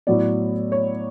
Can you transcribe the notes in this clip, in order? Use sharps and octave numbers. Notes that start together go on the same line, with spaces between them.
A2 F#3 B3 E4 D5
C#5